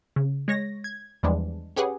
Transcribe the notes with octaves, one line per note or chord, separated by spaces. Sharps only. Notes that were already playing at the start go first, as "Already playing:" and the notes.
C#3
G#3 C#5 A#6
G#6
E2 E3 F3 G3 G#3 D4
C#4 G4 G#4 B4 F#5